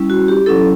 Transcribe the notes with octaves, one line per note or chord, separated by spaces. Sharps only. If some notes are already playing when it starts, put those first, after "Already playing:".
Already playing: G3 C#4 E4
F#4
G4
F#3 C#4 E4 A4